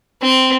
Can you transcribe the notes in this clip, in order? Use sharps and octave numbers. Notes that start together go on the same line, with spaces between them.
C4